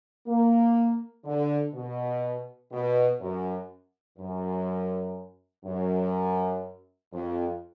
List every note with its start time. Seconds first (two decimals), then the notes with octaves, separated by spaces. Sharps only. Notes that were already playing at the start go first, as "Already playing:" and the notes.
0.27 A#3
1.25 D3
1.73 B2
2.72 B2
3.20 F#2
4.18 F#2
5.65 F#2
7.13 F2